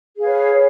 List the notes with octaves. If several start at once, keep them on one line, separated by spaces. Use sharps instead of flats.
G#4 B4 C#5 F5